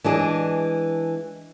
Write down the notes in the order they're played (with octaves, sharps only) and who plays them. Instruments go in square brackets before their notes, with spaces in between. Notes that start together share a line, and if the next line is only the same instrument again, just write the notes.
[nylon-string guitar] E3 G#3 D4 G#4